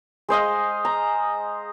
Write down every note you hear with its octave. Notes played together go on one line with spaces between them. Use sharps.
G#3 C5 D#5 F5
A#5